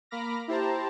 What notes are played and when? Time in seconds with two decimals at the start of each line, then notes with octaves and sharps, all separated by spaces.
0.11 A#3 B5 D6 F6 A#6
0.48 E4 G4 C5 A5 A#5